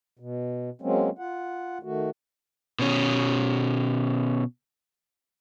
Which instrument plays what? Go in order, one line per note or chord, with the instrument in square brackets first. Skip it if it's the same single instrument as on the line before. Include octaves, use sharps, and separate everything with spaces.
[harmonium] B2
F#3 G#3 A#3 C4 C#4
F4 F#5
D#3 A3 F#4
[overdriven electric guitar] B2 C#4